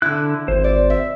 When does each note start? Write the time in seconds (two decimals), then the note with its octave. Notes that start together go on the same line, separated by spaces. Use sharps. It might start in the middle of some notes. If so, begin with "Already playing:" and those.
0.02 D3 E4 F#6
0.48 G#1 C5
0.64 D5
0.90 E5